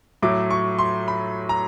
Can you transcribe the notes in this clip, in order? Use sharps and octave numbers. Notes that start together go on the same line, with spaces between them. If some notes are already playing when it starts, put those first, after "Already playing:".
A2 F#3 A3 D6
C#6
C6
B5
A#5